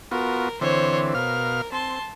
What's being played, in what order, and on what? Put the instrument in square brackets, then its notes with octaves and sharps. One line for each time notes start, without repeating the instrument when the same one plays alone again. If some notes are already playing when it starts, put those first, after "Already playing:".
[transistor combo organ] B3 F4 F#4 [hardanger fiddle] A#4
[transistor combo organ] D3 E3 C4 [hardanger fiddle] C5 C#5
[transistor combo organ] B2 F5 F6 [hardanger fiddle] A#4
[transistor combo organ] C4 [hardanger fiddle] A5 C6